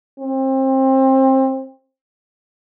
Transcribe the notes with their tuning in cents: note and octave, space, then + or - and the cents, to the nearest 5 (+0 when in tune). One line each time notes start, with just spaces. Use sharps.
C4 +25